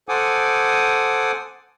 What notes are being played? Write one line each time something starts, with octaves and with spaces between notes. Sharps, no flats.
A4 C5 F#5 G#5 D6 D#6